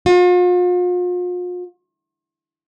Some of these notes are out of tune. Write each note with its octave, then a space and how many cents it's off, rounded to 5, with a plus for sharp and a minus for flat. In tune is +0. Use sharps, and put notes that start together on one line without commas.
F4 +40